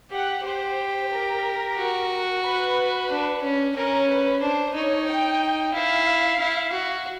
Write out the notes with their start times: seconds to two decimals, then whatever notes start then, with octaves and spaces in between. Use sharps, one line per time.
0.11 G4 F#5
0.44 G4 C5
1.11 A#4
1.77 F#4
2.43 B4
3.09 D4
3.42 C#4
3.75 C#4 A#4
4.09 B4
4.42 D4 C5
4.75 D#4 C#5
5.08 G5
5.74 E4 F5
6.40 E4
6.73 F#4